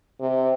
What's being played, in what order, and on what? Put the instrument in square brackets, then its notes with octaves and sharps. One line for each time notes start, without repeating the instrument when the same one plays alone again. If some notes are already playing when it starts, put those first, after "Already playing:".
[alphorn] C3